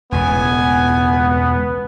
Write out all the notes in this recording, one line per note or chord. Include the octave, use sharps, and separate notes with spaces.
E1 C#2 A2 B3 G#5